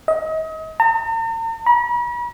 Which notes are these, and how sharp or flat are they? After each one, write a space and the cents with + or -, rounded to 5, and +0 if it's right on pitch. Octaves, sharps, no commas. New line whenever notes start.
D#5 +35
A#5 -45
B5 -45